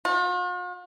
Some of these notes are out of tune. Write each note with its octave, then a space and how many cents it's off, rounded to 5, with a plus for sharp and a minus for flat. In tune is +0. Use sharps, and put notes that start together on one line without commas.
F4 +45